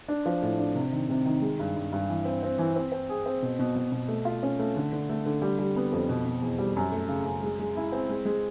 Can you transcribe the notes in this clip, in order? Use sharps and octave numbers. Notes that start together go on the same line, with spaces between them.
D4
F3
A2
D4
C3
D#3
C3
D#3
G#3
G2
G2
G2
E3
C4
C4
E3
C4
C4
G#4
C4
B2
B2
B2
B2
A3
F4
C#4
A3
D3
D3
A3
D3
G3
G3
B3
F2
B2
B2
E2
G3
F#2
A3
C#3
F#2
G#3
G#3
E4
C4
G#3
G#3